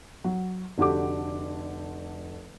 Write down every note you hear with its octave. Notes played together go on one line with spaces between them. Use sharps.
F#3
F1 D3 F#4 G4 D6